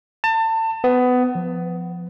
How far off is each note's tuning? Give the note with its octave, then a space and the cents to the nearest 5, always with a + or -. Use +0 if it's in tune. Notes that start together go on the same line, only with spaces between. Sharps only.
A5 +30
B3 +20
F3 +0